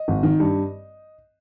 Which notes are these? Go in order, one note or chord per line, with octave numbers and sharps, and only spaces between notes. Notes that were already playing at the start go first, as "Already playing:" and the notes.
Already playing: D#5
G#1
D#3
G2